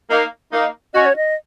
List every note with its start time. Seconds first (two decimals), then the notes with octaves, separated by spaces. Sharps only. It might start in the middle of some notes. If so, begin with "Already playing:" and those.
0.10 A#3 D#4
0.52 A#3 D#4
0.94 C#4 F#4 D#5
1.06 C#5
1.16 D#5